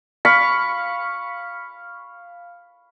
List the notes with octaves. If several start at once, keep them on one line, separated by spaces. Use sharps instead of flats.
F5 B5 C#6